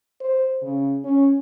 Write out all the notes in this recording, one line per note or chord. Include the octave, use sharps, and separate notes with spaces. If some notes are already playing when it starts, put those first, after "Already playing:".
C5
C#3
C#4